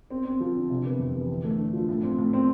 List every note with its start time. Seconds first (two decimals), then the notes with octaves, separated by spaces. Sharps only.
0.10 C4
0.25 C4
0.40 F3
0.55 D3
0.70 C3
0.85 B3
0.99 F2
1.15 E3
1.29 D3
1.44 A3
1.59 D3
1.73 F3
1.89 A2
2.03 C4
2.19 A2
2.33 C4